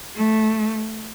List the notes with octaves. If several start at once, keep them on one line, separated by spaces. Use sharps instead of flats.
A3